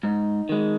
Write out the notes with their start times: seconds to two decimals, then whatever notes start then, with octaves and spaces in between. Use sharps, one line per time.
0.03 G#2 D#4
0.49 D#3 G#3